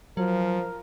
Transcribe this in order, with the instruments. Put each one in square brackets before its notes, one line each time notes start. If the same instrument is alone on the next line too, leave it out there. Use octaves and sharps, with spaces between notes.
[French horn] F3 [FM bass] F#3 [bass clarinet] A#4